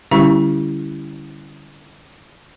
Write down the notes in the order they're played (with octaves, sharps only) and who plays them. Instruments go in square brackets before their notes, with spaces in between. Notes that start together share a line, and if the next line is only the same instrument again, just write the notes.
[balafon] D3 G3 C#4 E4 G4 C#6